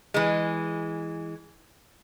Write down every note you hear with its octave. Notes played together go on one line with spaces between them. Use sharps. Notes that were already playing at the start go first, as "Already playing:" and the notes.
E3 G#3